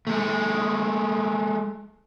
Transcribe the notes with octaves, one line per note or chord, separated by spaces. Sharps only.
G#3 A3